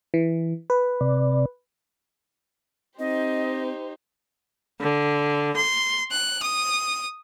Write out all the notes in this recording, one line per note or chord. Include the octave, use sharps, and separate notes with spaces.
E3
B4
C3 D5
C4 D#4 G4 C5 D#5
D3
C6
F#6
D#6